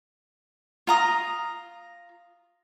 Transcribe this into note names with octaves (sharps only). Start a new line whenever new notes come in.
F4 A#5 D#6